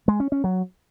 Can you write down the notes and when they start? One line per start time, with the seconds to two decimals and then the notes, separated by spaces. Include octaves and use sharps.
0.08 G#3
0.20 C#4
0.32 C#4
0.44 F#3